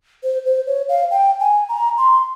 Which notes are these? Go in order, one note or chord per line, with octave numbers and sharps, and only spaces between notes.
C5
C5
C#5
F5
G5
G#5
A#5
C6